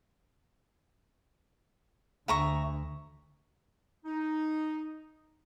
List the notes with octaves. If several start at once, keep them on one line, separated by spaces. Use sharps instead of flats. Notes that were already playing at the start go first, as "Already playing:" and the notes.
D2 E5 A#5 C#6
D#4